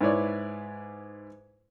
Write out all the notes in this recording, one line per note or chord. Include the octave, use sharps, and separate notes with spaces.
G#2 E4 B4 C#5 D5